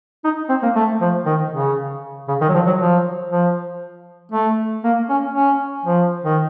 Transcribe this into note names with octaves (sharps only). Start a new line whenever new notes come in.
D#4
C4
A#3
A3
F3
D#3
C#3
C#3
D#3
F#3
F3
F#3
F3
F3
A3
A#3
C#4
C#4
F3
D#3